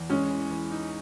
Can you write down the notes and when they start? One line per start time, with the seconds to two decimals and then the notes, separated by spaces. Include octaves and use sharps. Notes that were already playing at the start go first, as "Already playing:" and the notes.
Already playing: E2
0.10 G#3 C#4
0.30 E3
0.50 E3
0.71 D#4